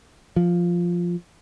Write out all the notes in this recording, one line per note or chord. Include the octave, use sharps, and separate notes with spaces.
F3